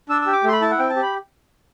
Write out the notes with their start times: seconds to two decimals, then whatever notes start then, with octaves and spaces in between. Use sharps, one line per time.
0.09 D4 E6
0.22 G4 E6
0.33 D6
0.44 A3 C6
0.52 B5
0.61 E4 A5
0.71 F#5
0.79 C4 G5
0.90 A5
0.96 G4
1.02 B5